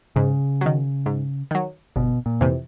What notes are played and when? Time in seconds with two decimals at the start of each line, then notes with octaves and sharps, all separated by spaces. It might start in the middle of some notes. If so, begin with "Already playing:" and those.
0.16 G#2 C#3
0.61 D#3 F#3
1.06 G#2
1.51 D#3 F#3
1.96 G1 B2
2.26 A#2
2.41 F2 C3 E3